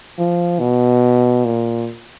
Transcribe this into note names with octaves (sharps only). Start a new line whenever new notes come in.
F3
B2
A#2